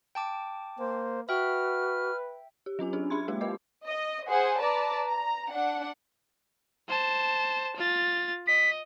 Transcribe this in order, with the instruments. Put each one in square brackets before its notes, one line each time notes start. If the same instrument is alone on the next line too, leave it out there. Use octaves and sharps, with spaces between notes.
[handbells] G5 A5 D6
[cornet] A#3 [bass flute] C5
[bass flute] F#4 [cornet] B4 [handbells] E5 G5 [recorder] F6
[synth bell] G4
F#3 C#4 F4 G#5
D4 G4 G#4
D4 E5 B5 C6 G#6
G#3 A#3 F4 G4
G4 A#4 B4 D#5 D6
[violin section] D#5
G#4 C5 F#5
B4 D5 A5 A#5
A#5
D4 F#5
[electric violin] C5 A5
F4 A6
[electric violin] D#5 [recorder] B6